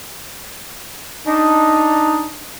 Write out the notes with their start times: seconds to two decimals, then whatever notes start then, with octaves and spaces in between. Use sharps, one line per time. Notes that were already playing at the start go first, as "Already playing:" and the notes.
1.26 D4 D#4